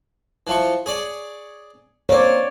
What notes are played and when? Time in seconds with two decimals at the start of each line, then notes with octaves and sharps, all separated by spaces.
0.47 E3 F3 C#6
0.86 G#4 C#5 D5
2.09 A#3 C4 C#5 D5